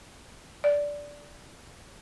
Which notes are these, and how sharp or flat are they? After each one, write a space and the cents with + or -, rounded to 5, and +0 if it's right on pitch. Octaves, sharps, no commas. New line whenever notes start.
D5 -10